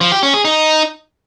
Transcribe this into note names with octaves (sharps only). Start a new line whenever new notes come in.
F3
G4
C#4
G#4
D#4